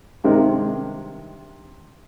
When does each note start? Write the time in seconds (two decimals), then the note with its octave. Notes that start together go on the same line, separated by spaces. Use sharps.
0.24 G2 C3 D#3 G#3 A#4